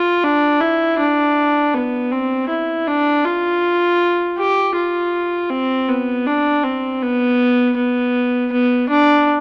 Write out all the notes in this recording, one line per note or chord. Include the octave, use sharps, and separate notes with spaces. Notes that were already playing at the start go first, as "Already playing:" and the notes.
Already playing: F4
D4
E4
D4
B3
C4
E4
D4
F4
G4
F4
C4
B3
D4
C4
B3
B3
B3
D4